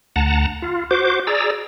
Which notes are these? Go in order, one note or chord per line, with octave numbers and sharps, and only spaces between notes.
D2 F#5 A5 A#5
F4
F#4 C5 D6
G#4 D5 A#5 E6